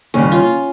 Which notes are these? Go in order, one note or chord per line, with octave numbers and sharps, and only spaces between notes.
D#2 C#3 G3 C#4
F4